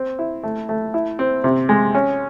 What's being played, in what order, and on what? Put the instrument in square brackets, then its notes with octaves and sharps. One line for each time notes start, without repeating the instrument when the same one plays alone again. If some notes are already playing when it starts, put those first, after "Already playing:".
Already playing: [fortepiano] C4
E4
A3
A3
E4
C4
C3
G#3
C#4